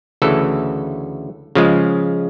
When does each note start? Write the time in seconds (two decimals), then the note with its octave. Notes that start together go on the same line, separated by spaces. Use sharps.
0.22 D2 C#3 E3 A4
1.55 C#3 F3 G#3